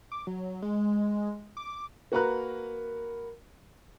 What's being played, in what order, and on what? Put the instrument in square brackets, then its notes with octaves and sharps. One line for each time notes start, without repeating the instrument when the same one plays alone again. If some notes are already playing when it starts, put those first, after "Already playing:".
[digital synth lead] D6
F#3
G#3
D6
[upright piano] A#3 F#4 A#4 B4 A#5 F#6